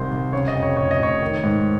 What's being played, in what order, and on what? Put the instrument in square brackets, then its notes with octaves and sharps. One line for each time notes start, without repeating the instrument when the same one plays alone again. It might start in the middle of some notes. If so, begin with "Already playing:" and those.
Already playing: [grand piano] C2 C3 D#3 C5
C2
C#3 C#5
D#5
F2
C#5
F1 C#5
D#5
F1 C#5
D#3
G#2